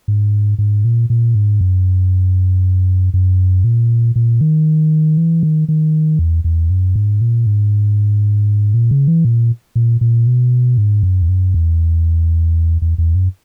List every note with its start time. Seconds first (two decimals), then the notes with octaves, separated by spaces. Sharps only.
0.08 G#2
0.58 G#2
0.85 A#2
1.10 A#2
1.35 G#2
1.61 F#2
3.14 F#2
3.64 A#2
4.16 A#2
4.41 D#3
5.17 E3
5.43 D#3
5.68 D#3
6.19 E2
6.44 E2
6.70 F#2
6.96 G#2
7.21 A#2
7.46 G#2
8.74 A#2
8.91 C#3
9.08 E3
9.25 A#2
9.76 A#2
10.01 A#2
10.27 B2
10.78 G#2
11.03 F#2
11.22 E2
11.29 F#2
11.54 E2
12.82 E2
12.98 E2
13.15 F#2